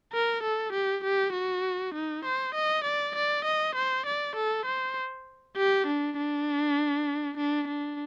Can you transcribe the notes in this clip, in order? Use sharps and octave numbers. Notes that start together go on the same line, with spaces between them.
A#4
A4
G4
G4
F#4
D#4
C5
D#5
D5
D5
D#5
C5
D5
A4
C5
G4
D4
D4
D4
D4